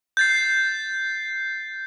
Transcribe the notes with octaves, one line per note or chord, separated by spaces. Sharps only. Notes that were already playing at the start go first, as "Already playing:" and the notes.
G6 A6 C7